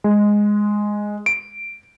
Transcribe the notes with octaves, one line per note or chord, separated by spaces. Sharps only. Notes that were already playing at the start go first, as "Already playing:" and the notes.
G#3
D7